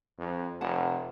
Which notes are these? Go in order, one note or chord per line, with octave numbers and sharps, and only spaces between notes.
F2
F1 F#5 A5